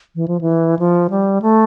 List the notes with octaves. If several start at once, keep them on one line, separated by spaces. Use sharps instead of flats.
E3
F3
E3
F3
G3
A3